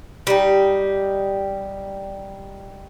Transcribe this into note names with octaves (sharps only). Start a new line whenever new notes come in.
G3 D#4